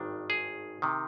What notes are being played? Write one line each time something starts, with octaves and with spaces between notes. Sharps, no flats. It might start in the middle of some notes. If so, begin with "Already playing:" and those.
Already playing: G#1 G2 D#3 D4
G#4
C3 D#3